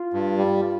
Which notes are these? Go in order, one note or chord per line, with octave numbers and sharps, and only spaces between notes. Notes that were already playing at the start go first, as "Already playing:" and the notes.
Already playing: F4
G2
G3